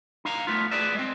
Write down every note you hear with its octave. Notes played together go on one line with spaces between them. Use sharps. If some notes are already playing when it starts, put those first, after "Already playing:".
D#4 F5 A#5
A3 B3 F4
G#4 B4 D5 E5
G#3 C4